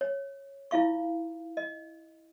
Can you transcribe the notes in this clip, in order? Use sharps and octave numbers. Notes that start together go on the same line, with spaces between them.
C#5
E4 F4 F5 C#6
D#5